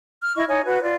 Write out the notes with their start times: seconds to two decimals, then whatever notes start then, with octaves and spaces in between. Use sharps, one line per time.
0.22 F6
0.36 E4 D#5 C#6
0.48 D#4 C#5 G#5
0.65 F#4 B4
0.83 F4 D5